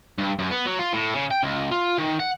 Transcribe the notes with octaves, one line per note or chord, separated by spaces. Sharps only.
G2
F#2
B3
F#3
F4
A2
C#3
G5
C#2
F4
D#3
F#5